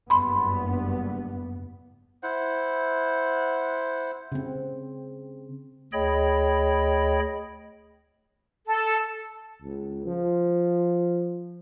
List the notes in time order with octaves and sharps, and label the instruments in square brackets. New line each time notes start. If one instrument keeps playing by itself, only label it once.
[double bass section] F#1 G2 B3 [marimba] B5 C6
[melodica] E4 C5 F#5
[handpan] C#3 C4
[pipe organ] D2 G#4 C#5 D#5 G5 B5
[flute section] A4
[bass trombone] C#2
F3